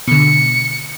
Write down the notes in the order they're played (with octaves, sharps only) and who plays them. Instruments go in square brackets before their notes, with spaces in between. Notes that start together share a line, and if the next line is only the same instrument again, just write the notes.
[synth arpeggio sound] B2 D3 [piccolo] C#7